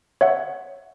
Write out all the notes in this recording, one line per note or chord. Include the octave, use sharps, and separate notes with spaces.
C#5 E5 F#5